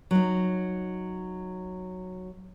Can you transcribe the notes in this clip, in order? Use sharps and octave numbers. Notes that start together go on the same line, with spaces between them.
F#3 D#4